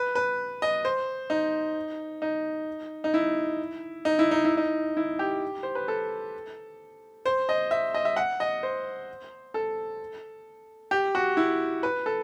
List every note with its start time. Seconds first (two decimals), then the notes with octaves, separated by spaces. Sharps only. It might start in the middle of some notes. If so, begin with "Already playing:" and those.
Already playing: B4
0.15 B4
0.62 D#5
0.85 C5
1.30 D#4
2.22 D#4
3.04 D#4
3.14 E4
4.05 D#4
4.19 E4
4.31 D#4
4.45 E4
4.57 D#4
4.97 E4
5.19 G4
5.63 C5
5.75 B4
5.88 A4
7.26 C5
7.49 D#5
7.71 E5
7.94 D#5
8.05 E5
8.16 F#5
8.40 D#5
8.63 C5
9.54 A4
10.91 G4
11.15 F#4
11.37 E4
11.83 B4
12.06 A4